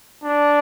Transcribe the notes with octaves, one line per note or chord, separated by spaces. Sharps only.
D4